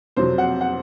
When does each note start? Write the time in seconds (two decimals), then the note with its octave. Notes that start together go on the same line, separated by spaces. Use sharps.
0.17 F2 C3 F#3 C5
0.38 F#5
0.61 F#5